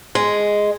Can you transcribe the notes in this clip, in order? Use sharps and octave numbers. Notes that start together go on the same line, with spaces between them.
G#3